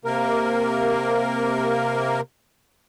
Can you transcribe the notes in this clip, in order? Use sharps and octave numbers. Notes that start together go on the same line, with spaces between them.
C3 A#3 A#4